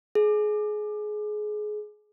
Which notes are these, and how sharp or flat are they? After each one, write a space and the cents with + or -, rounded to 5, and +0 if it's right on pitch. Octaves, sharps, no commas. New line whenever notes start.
G#4 +25